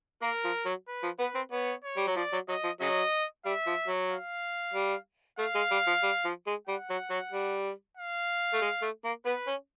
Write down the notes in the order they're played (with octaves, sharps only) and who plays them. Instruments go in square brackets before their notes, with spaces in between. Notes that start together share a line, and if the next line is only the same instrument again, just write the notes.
[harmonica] A#3 [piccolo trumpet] A#4
[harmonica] F3
F#3
[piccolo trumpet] B4
[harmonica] F3
[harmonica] B3 [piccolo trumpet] B4
[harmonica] C4
[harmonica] B3 [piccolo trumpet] C#5
[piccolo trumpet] C#5
[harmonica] G3
F#3
[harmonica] F3 [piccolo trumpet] D5
[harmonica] F#3
[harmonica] F#3 [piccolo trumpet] D#5
[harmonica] F3
[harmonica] C#3 F#3 [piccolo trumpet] D#5
[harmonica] G3 [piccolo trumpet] E5
[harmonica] F3
F#3
[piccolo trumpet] F5
[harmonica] G3
[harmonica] A3 [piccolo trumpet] F5
[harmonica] G#3
G3
F3
G3
F3
G#3
[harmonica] G3 [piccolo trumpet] F#5
[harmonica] F#3
F#3
G3
[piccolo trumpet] F5
[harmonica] A3
G#3
A3
A#3
[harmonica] B3 [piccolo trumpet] B4
[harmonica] C#4